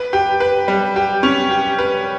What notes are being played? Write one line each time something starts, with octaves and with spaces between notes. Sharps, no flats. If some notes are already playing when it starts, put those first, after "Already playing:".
Already playing: B4
G4
B4
G3
G4
C#4
G4
B4